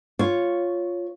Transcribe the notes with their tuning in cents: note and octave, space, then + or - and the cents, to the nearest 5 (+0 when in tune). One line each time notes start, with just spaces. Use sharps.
F4 +0 C#5 +0